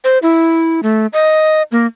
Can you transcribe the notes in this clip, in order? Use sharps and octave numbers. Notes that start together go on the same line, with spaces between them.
C5
E4
A3
D#5
A#3